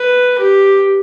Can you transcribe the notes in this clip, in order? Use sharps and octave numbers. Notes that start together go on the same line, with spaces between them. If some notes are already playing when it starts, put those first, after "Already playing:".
Already playing: B4
G4